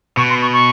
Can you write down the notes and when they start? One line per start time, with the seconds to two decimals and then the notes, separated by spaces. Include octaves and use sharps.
0.17 B2 C#6
0.29 C6
0.42 C#6
0.53 C#6